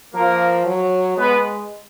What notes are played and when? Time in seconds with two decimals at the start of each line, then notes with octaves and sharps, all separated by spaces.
0.14 F3 A#3 A#4
0.66 F#3
1.17 G#3 B3 B4